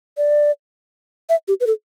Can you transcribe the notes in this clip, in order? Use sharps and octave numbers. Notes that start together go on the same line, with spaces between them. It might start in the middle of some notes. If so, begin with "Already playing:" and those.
D5
E5
G4
B4
A4